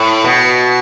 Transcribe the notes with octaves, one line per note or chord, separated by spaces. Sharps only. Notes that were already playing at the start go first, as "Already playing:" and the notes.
Already playing: A2
B2